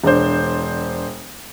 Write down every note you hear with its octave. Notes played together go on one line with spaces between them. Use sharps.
E1 D4 C5